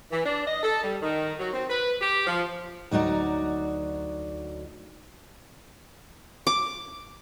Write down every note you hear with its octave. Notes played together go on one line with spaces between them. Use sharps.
E3
D4
D#5
A4
G3
D#3
F#3
C4
B4
G4
F3
D2 F#3 D#4 F#4 D5
D6